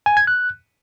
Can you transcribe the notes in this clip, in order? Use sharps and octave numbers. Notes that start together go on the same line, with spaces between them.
G#5
G#6
F#6